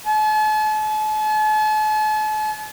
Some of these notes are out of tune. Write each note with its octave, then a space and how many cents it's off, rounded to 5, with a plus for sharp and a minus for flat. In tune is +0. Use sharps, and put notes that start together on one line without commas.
A5 -45